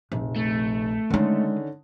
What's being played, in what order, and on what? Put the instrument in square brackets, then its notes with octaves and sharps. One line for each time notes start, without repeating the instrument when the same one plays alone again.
[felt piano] F1 [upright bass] A#1
[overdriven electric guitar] A3
[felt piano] D3 C#4 D#4 [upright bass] D#3 G#3